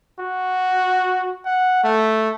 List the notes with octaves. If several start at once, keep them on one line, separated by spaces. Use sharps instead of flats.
F#4
F#5
A3